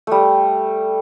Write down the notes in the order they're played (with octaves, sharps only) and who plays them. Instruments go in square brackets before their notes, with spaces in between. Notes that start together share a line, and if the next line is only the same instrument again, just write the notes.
[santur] G3 A3